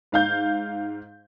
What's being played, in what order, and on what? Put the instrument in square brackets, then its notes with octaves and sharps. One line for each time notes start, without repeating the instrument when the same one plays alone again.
[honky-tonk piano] G#2 F5 G6